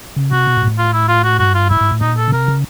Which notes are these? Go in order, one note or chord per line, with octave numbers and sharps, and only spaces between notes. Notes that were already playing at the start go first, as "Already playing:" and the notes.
C#3
C3 F#4
B2
A#2
G#2
A2
F4
E4
F4
F#4
G2 F#4
F4
G#2 E4
G#2
A2
A#2 D#4
A4
C#3
C3 A#4
C#3